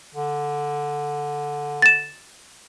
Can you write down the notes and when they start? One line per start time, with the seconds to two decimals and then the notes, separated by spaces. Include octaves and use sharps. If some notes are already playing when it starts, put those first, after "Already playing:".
0.15 D3
1.82 A6 E7